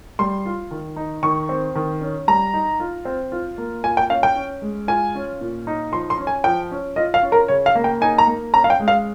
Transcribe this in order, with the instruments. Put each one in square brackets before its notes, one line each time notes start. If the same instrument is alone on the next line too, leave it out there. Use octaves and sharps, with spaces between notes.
[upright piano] G3 C6
F4
D#3
D#4
D#3 C#6
C4
D#3
C#4
G3 A#5
D#4
F4
C4
F4
A#3
F4 G#5
G5
C#4 F5
G5
C#4
G#3
F4 G#5
C#4
A#2
D#4
F3 C6
C6
C#4
G#5
F3 G5
C#4
F4 D#5
F5
C#4
A#4
C#3 C#5
F5
A#3
G5
D#4 G#5
A#5
A#3
C#4 A#5
F5
G5
G#3
F5